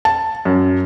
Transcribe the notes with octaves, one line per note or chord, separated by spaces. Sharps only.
A5
F#2